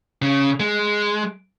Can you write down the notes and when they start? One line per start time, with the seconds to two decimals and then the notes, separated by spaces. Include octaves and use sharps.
0.22 C#3
0.60 G#3